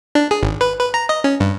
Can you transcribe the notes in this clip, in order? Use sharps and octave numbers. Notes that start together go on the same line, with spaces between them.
D4
G#4
G#1
B4
B4
A#5
D#5
C#4
G2